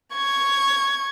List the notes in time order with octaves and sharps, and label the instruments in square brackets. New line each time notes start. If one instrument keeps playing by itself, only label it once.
[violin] C#6 G#6